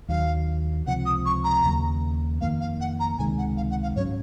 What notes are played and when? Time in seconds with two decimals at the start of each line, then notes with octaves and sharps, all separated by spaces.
0.08 D#2 D#3 F#3 F5
0.86 C#2 C3 F3 F#5
1.05 D#6
1.25 C#6
1.44 A#5
1.64 D#2 C#3 F#3 A#3
2.41 F2 D#3 A#3 F5
2.60 F5
2.80 F#5
3.00 A#5
3.18 C#2 C3 D#3 G#3 G#5
3.38 F#5
3.57 F5
3.70 F#5
3.83 F5
3.96 G#2 F#3 C#4 C#5